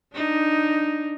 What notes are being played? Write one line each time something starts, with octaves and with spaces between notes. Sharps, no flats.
D4 D#4